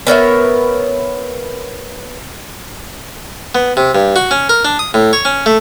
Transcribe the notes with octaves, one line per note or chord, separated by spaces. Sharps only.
B3 A#4 C#5 E5
B3
C3
G2
F#4
C#4
A#4
D4
D#6
A2
C#5
C#4
A3